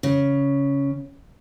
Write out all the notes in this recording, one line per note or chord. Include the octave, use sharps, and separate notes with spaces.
C#3